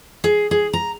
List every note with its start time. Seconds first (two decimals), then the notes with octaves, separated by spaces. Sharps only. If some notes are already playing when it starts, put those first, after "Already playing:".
0.24 G#4
0.51 G#4
0.73 A#5